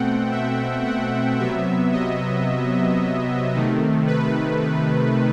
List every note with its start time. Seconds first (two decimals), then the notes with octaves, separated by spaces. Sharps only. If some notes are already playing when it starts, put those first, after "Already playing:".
Already playing: B2 A3 C4 F#5 G5
0.32 E5
0.85 F#5
1.39 C3 F#3 B3 E5
1.93 D#5
3.54 C3 D#3 A3
4.07 B4